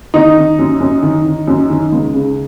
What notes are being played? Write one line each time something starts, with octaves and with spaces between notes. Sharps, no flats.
D#3 D#4
D#3
F#2
F#2
D#3
D#3
F#2
D#3
C#2
C#3